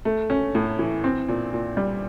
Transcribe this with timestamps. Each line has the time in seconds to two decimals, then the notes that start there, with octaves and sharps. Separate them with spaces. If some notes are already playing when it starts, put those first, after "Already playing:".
0.05 A3
0.30 C#4
0.55 A2
0.79 E3
1.04 C4
1.28 A#2
1.53 A#2
1.77 G3